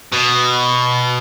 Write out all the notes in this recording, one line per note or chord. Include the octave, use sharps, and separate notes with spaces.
B2